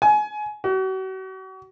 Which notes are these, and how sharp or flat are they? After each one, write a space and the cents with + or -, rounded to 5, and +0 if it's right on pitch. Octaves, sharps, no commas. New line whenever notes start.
G#5 +25
F#4 +40